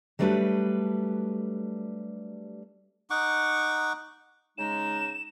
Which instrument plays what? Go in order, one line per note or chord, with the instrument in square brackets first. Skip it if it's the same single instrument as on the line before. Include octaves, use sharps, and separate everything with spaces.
[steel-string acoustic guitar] F#3 G3 A3 D4 B4
[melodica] D#4 F#5 C#6 D6
[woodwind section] C#3 G#3 D#4 [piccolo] E7